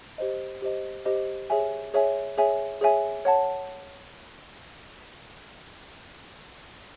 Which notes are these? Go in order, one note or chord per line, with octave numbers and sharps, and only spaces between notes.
G4 C5 D#5
G4 C5 D#5
G4 C5 D#5
G#4 C#5 E5 G#5
G#4 C#5 E5 G#5
G#4 C#5 E5 G#5
G#4 C#5 E5 G#5
C#5 F#5 A5